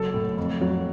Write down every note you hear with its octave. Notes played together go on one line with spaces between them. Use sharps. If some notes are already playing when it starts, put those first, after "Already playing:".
Already playing: F#1 F#3 A4
A2
F2
F#3